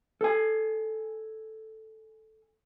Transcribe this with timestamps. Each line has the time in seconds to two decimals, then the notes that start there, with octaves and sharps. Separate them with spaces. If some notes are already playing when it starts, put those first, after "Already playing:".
0.21 A4 G#5